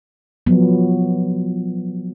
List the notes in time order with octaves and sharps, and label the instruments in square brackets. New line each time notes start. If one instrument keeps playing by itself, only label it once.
[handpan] F3 F#3 B3